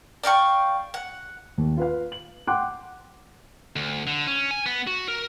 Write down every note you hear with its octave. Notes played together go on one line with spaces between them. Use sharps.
D5 F5 G5 C#6
F#5
D#2
F4 B4 F5
F#7
F#5 G5 C6 D6 F#6
D2
D3
C#4
G#5
B3
F#4
A#4